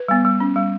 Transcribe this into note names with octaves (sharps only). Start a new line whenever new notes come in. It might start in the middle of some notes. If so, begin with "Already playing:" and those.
Already playing: B4
G3 B3
G3
C#4
G3